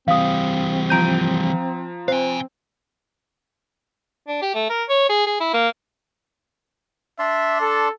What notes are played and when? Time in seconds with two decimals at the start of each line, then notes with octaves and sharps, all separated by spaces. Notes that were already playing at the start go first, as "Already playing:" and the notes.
0.08 E3 G3 C4 F5 D#6
0.90 F3 A#5 G6 D7 D#7
2.08 C4 C5 F5 G#5
4.28 D4
4.42 G4
4.55 A3
4.70 A#4
4.89 C#5
5.09 G#4
5.27 G#4
5.40 E4
5.54 A#3
7.19 D4 D5 E5 C6
7.61 A4